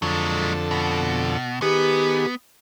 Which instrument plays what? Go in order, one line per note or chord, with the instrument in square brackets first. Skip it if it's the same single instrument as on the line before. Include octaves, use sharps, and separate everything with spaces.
[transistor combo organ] F2 D3 A4 [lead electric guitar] F#3 G#3
[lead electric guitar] B2
[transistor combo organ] D#3 G#4 B4 [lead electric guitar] B3 [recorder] G4